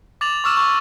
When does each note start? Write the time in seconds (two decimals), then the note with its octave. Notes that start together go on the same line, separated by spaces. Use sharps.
0.21 D6 A6 F7 F#7
0.44 C#6 D6 E6 F6 E7
0.57 C#6